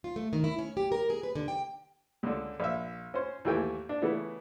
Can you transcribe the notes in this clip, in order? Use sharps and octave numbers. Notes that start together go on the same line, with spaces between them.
F4
A3
D#3
E4
C#4
G4
A#4
G#4
B4
D3
G5
C#2 D3
A#1 E5
C#4 C5
D#2 E3 A3 G5 G#5
D4
C#3 E3 A3 B3